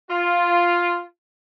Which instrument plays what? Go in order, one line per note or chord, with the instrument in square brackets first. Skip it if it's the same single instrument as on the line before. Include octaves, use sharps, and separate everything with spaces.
[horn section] F4